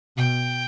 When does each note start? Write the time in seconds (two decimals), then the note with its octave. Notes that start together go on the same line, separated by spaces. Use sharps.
0.17 B2 G5